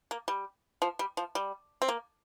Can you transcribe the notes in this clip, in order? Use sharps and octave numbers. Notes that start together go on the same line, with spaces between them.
A#3
G3
F3
G3
F3
G3
C4
A#3